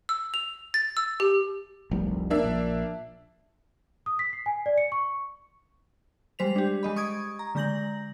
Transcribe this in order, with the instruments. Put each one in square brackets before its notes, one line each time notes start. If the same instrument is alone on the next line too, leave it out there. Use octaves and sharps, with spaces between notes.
[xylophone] E6
F7
A6
E6
G4
[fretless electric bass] F1 C2
[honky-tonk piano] A#3 D4 E5
[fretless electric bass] A#1
[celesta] D#6
B6
C7
G#5
D5
C#7
C#6
[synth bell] G3 G#3 C5 B6 F7
D4 G4
G#3 D#5 B5
C#6 D#6 G#6 D7
A#5
D3 G#3 A#5 G6 A#6 F#7